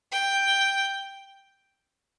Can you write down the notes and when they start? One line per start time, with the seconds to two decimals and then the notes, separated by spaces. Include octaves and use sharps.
0.12 G5